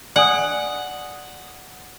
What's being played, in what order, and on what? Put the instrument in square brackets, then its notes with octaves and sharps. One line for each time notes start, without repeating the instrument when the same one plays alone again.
[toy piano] D5 G#5 D#6 [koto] F#5